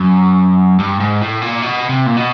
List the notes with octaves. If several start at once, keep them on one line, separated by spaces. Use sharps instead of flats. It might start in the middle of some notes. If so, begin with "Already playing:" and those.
Already playing: F#2
G2
G#2
A2
A#2
B2
C3
A#2
B2